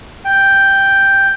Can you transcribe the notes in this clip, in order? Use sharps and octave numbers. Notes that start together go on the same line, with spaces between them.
G5